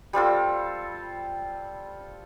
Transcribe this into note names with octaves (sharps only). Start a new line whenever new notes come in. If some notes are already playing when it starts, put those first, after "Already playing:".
G3 C4 F4 A4